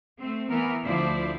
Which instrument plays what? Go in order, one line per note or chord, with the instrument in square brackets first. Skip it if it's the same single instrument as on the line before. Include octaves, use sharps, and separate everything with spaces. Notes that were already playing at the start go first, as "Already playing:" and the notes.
[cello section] A3 C4
E3 B3 A#4
D2 F3 E4 C5 D5